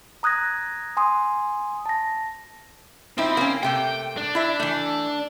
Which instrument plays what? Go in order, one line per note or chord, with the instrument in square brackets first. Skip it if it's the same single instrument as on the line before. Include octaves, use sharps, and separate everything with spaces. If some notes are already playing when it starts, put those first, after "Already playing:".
[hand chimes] A#5 D#6 F#6 G#6 A#6
G#5 C6 D#6
A5 A#6
[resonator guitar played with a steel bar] F3 D#4 E4 [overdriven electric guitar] C4
[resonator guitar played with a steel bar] A#3 C#4
[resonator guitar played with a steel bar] C3 A3 A#3 [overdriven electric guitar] G5
[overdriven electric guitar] D4
[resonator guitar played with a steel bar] E4 E5
E3 A3